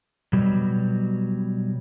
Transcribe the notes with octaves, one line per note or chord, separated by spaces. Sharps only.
B2 F#3 G3